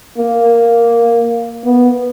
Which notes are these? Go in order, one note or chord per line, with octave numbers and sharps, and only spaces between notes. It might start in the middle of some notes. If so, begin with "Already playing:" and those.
A#3
B3